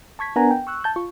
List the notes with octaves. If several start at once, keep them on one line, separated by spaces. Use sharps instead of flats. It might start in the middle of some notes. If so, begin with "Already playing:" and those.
A5 C#6 G#6 B6
B3 D4 A#4 F#5 G#5 A#5
G5
C#6 E6 F#6
A5 G6
F4 C#6